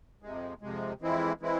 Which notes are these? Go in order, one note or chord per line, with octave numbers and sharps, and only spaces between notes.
F2 C3 G#3
F2 C3 G#3
F2 E3 G#3 C4 E4
E3 G#3 C4 E4